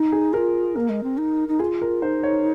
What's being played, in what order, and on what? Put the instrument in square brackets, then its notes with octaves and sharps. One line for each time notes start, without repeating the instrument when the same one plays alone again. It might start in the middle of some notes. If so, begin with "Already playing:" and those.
Already playing: [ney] D#4
[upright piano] G#4
[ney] F4 G#4 [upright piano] A#4
[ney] A#3 [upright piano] A#4
[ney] G#3
C4
D#4
D#4
[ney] F4 [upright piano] G#4
[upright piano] A#4
[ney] D#4 [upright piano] C5
[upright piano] C#5